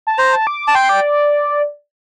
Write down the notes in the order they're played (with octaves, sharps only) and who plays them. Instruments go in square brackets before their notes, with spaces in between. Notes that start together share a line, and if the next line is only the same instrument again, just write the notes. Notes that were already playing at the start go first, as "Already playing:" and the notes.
[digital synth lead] A5
[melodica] C5 [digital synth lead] A#5
[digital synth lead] A5
D6
[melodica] A5
[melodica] G5 [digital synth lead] C6
[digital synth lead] D5